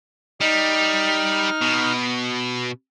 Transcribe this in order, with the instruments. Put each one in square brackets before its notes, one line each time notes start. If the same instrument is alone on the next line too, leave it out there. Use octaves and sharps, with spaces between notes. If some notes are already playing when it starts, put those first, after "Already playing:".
[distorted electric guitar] G3 [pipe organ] D#4 F6
[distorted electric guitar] B2